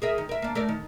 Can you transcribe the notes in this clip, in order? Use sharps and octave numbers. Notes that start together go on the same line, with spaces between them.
G#4 A#4 E5
D#3
A#4 E5
A#3 D4
A3 A#4 D5
D#3